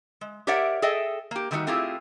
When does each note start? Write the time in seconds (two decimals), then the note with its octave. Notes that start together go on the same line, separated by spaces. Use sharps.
0.21 G#3
0.47 G4 A#4 C#5 D5 E5 F#5
0.82 G#4 A4 D#5 E5 G5
1.31 A#3 G4
1.51 D3 D#3 G3 A3 D#4 F#4
1.67 A3 C4 E4 F4 G4 G#4